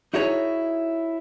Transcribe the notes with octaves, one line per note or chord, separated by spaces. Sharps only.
D#4 E4 F#4 G#4 C#5